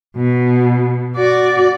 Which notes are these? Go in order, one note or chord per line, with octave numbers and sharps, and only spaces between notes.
B2
F#4 D5